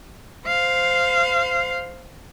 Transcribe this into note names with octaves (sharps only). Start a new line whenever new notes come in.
C5 F5